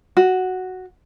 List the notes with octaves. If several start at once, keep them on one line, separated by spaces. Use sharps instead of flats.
F#4